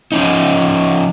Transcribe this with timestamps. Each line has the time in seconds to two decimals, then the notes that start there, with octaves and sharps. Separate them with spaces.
0.12 F3 C#4 D#4